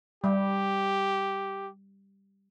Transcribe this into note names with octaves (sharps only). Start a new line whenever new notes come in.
G3 G4